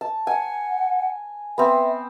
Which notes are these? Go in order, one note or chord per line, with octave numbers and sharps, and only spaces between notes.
A5
F#5 G#5
B3 C4 E5